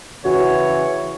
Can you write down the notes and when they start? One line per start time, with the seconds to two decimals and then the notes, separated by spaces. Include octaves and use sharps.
0.25 C#3 E3 F#4 C#5